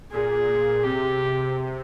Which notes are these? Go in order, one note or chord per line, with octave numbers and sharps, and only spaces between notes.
A#2 G#4
A#2
C3 G4